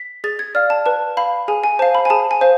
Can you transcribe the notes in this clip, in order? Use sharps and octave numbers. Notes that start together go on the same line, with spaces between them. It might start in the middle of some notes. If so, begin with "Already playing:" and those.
Already playing: B6
G#4 A6
G#6
D5 F5 F6
A5
B4 A5
F5 B5
G#4 G#5
G#5
C5 F5 A5
B5
G#5
G#4 A5
G#5
C5 F5